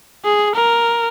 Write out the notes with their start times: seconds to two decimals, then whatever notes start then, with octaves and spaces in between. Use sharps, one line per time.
0.25 G#4
0.55 A#4